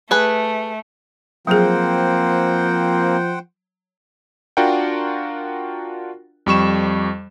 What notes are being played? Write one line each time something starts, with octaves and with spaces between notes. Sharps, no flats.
A3 G#4 B4
F3 F#3 A#3 C4 G#4 C5 F#5 G5
D4 F4 F#4 A#4 F#5 G5
F2 G3 C#6 E7